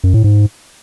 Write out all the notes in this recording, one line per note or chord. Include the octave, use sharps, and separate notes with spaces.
F#2
A2
G#2